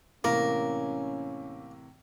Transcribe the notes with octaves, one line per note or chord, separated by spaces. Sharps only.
A2 C3 E3 A#3 C#4 A#4